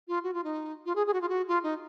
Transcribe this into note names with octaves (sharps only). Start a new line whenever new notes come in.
F4
F#4
F4
D#4
F4
G#4
G#4
F#4
F4
F#4
F4
D#4